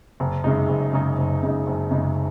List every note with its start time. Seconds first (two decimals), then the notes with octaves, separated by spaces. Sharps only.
0.20 F#1
0.44 F#2 C#3 G#3 D#4
0.69 F#1
0.93 F#2 C#3 G#3 D#4
1.18 F#1
1.43 F#2 C#3 G#3 D#4
1.67 F#1
1.91 F#2 C#3 G#3 D#4